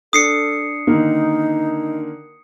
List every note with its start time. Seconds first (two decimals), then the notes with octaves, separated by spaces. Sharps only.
0.13 D4 A4 D#6 C7 C#7
0.87 D3 D#3 A#3 D#4